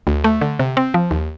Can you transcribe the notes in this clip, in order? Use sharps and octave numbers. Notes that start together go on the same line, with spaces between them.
D2
A3
D3
C3
C4
F3
D#2